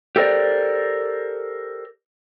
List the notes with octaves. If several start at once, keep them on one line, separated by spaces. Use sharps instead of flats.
G4 A4 A#4 C5 D5